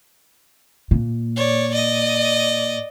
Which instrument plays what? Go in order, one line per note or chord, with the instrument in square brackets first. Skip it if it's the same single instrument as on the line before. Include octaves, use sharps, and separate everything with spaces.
[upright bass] A#2
[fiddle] C#5 D5
D5 D#5